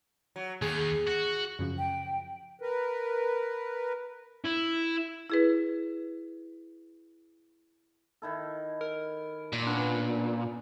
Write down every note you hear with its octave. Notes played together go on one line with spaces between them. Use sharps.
F#3
D#2 G#4
F#4
F#2 C#3 F3
G5
A#4 B4
E4
E4 G#4 B4
D#3 E4 A4
A#4
A#2
B3 C#4 D4